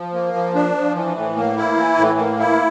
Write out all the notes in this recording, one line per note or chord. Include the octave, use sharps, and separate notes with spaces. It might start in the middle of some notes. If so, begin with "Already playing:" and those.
Already playing: F3
A#3
F3
D4
F3
E3
A2
A#3
E4
E3
A2
A#3
E4